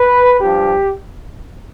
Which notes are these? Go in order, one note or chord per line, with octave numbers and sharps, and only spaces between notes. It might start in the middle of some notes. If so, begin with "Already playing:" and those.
Already playing: B4
G2 F3 G4